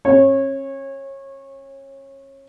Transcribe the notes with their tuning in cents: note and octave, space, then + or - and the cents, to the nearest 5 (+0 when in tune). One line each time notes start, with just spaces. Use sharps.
C#4 -40 C#5 -25